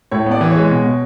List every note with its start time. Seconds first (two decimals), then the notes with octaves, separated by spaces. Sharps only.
0.11 A2 C#5
0.26 B3 D5
0.41 E3
0.51 G#3 C#5
0.70 B2
0.85 B2